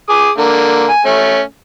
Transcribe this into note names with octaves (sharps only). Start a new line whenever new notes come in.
G#4 D6 D#6
D3 A#3
G#5
A3 C#4